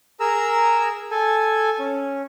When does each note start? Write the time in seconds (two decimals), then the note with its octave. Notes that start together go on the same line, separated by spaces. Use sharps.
0.20 G#4 A#4 A#5 E6
1.11 A4 G#5
1.79 C#4